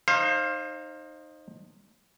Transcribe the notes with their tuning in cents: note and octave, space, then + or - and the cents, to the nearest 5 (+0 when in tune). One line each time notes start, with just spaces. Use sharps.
D#4 -10 C5 +25 F5 +0